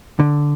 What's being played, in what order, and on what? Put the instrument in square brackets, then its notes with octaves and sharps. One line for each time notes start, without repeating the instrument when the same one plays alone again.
[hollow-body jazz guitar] D3